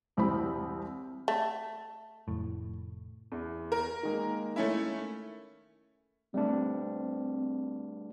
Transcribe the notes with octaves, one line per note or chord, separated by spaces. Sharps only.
E1 C2 C4 E4 G4 B5
A3
F1 A2
E2
A#4
D#3 G#3 A#3
A3 C#4 E4
G3 A3 C4 D4